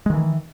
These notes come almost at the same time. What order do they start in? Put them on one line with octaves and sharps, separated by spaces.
G#3 D#3 E3